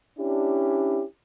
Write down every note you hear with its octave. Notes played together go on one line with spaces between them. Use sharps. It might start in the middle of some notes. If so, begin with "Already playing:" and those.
C#4 D4 E4 G4